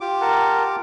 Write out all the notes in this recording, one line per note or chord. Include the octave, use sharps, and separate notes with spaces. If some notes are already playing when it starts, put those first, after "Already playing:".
F4 G4 D6
A#4 F#5 A5